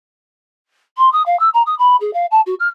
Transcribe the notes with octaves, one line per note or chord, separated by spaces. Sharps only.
C6
D#6
F5
E6
A#5
D#6
B5
G#4
F5
A5
F#4
F6